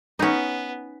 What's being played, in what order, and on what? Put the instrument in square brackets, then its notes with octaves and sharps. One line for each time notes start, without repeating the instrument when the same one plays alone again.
[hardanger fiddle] B3 [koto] C#4 D#4